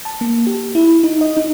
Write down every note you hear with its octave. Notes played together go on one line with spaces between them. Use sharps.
A5
A#3
G4
E4
D#4
D#5
D#4